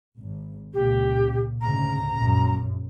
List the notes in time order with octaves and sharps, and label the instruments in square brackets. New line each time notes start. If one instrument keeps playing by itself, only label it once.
[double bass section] G#1
[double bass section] C#2 A#2 C#3 [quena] G4
[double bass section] D2 G#2 C#3 [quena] A#5
[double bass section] A#1 F#2